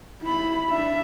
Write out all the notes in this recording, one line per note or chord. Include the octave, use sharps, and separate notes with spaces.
E4 B5
D4 E5